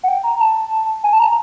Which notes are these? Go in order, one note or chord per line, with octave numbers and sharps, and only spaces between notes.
F#5
G5
A#5
A5
G#5
A5
A#5